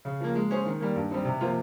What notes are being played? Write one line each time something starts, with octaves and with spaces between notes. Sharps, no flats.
C#3
F3 A#3
G#3
C#4 G#4 C5
D#3
G3 A#3
G2
G3 C4 D#4
C3
F3 A#3 F4 C5